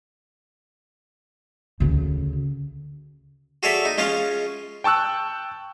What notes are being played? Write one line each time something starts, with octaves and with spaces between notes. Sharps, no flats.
D2 C#3
F#4 G#4 A4 C#5 D5 E5
D#4
G#3 C#4 F4 C#5
G5 A5 C#6 E6 F#6